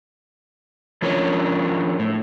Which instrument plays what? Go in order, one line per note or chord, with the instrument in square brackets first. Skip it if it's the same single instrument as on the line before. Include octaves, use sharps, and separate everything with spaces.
[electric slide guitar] F3 C#4 D4 F4 A#4 C#5
A2